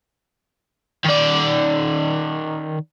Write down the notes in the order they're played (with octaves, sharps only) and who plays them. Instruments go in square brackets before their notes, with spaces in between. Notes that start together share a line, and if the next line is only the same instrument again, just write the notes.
[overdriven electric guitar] D#3 D5